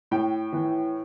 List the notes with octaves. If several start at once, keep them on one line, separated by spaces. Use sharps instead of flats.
A2 G5
E3